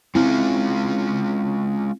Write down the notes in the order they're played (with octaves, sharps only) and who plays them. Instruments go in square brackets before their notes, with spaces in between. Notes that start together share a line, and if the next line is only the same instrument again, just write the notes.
[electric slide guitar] G#3 C#4 F4 [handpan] C4 E4